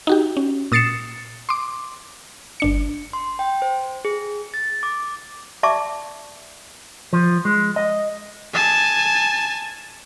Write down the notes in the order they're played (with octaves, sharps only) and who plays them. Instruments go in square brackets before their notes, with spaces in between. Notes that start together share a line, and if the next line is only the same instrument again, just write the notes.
[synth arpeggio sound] D#4 F#4 G4
C#4
A#2 D#6 A6 C7 C#7 E7
C6 D6
G1 D4 C#7
[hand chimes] C6
G5
C5
G#4
A6
D6
[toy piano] D5 E5 A5 C#6 D6
[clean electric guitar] F3
G#3
D#5
[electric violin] G#5 A5